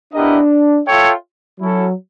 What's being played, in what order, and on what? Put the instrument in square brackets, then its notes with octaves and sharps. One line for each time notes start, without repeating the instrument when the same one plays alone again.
[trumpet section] B3 E4 G4 A#4 D#5 [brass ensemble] D4
[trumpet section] F4 A4 C#5 E5 G5
[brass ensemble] F#3 [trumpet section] C#4 E4 A4